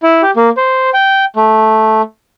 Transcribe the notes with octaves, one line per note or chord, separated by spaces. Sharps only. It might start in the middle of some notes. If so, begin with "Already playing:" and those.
E4
G4
A#3
C5
G5
A3